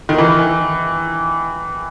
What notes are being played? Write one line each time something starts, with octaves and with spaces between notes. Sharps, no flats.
D#3
E3